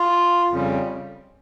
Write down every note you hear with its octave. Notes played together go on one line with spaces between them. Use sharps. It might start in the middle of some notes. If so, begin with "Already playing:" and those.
Already playing: F4
F2 C#3 G3